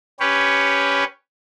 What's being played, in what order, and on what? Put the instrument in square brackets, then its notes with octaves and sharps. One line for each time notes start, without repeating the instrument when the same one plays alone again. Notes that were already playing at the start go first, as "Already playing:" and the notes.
[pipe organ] C#4 G4 B4 C#5